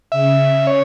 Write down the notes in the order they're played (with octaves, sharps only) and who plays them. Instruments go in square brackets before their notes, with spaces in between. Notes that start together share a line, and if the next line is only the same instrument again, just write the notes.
[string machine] C#3 [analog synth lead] E5
[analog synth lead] C#5